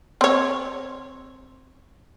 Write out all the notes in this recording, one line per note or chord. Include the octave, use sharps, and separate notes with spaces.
C4 C#5